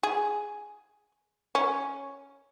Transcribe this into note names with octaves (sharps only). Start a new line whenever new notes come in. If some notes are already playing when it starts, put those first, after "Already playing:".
G#4
C#4